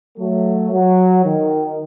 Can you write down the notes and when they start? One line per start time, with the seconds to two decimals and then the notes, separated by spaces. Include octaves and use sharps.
0.18 F#3 A3
0.72 F#3
1.25 D#3